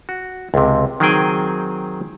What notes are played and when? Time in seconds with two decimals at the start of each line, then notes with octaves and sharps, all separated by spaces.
0.09 F#4
0.54 C#2 C3
1.00 D#3 F#3 C4 G#4 G5 G#5